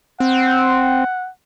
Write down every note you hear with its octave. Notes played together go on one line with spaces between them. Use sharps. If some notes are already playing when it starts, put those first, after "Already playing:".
C4 F#5